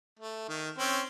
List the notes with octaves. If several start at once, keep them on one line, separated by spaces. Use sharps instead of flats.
A3
D#3
C4 C#4